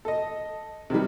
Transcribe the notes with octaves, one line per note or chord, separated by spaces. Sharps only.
A4 D#5
C3 D#3 E3 G3